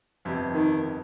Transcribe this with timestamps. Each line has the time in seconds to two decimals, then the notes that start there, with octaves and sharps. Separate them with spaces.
0.25 G1 F2 C3
0.54 D#3